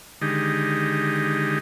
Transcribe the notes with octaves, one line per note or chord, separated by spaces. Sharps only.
D3 D#3 G#3 D#4 G4